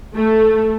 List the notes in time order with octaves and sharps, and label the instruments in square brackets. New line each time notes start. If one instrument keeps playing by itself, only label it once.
[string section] A3